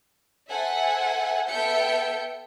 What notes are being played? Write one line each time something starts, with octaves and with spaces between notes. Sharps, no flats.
A4 C5 E5 F#5 G#5
B3 A4 E5 G5 G6 C#7